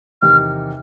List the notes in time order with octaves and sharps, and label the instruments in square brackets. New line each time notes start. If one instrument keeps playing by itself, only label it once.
[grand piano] E2 C3 D#3 [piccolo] F6